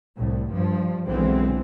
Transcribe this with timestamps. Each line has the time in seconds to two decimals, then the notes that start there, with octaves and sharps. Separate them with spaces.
0.18 C2 A2
0.51 G2 F3
1.07 B1 B2 D3 E3 G#3 C4